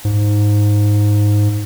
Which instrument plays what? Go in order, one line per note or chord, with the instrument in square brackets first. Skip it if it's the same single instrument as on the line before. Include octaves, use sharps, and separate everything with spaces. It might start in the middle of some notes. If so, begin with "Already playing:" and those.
[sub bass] G#2